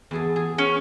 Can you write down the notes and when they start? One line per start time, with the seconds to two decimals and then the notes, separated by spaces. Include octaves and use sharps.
0.11 E2 G#4 A4
0.36 G#4
0.58 C#4